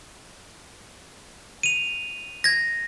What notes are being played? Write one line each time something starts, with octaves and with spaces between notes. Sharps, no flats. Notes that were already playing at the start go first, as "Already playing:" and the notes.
D#7 F7
G#6 A#6